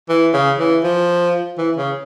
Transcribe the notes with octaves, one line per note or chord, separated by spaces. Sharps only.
E3
C#3
E3
F3
E3
C#3